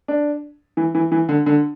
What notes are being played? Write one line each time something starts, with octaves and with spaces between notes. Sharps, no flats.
D4
E3
E3
E3
D3
D3